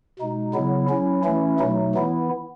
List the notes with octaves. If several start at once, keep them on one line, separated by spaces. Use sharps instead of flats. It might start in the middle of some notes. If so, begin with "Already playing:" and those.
B2 G#3 D#4
C#3 F#3 B3 E4
F#3 C#4 E4
E3 A3 C#4 E4
B2 F#3 A3 D#4
E3 B3 E4